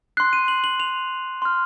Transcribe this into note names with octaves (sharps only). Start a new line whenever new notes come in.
C6 F#6 C7
D#7
F#7
F#7
F7
C6 F6